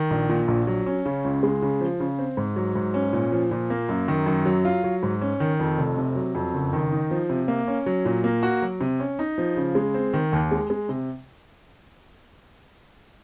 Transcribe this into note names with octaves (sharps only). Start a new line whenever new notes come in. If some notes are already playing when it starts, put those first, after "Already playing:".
Already playing: D#3
A#1
A#2
A#1
F#3
C#4
C#3
C#2
G#3
C#3
F3
C#3
C4
G#2
F#3
G#2
C#4
A#2
F3
A#2
A#3
F#2
D#3
F#2
F#3
F4
F#3
G#2
C#4
D#3
F2
F1
C3
F#3
F2
F#1
D#3
D#4
F3
C3
A#3
C#4
F#3
A#2
A#3
F#4
F#3
C3
C#4
D#4
F3
C#3
G#3
C4
D#3
D#2
G#3
G#3
C3